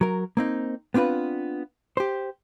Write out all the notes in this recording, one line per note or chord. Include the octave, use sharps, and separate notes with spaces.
F#3 A#4
A#3 C4 D#4
B3 C4 D4 F4 B4
G4 C5